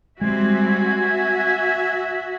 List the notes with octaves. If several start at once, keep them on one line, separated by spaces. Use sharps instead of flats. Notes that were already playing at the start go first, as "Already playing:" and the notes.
G3 G#3 C4 F#4 E5 G#5
E5